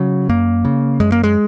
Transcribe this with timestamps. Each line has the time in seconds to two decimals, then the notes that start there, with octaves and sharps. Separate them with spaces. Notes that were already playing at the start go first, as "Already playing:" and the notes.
Already playing: C#3 F#3
0.29 F#2 A#3
0.65 C#3
1.00 F#2 G#3
1.12 A#3
1.24 G#3